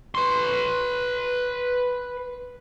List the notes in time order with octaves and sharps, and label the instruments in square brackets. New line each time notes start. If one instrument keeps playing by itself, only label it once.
[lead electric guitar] B4 C6